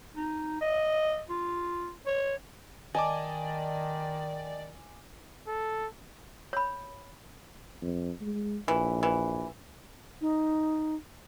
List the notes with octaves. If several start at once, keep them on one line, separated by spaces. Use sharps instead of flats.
D#4
D#5
F4
C#5
D#3 D5 D#5 G#5 A5 D6
A4
C#5 B5
F2
G#3
A#1 E3
E3
D#4